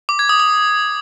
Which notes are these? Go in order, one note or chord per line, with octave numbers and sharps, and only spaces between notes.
D6
G#6
D#6
D#6